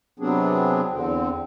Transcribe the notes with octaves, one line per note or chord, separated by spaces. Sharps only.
C3 F#3 B3 C4 D4 G#4
E2 D3 C4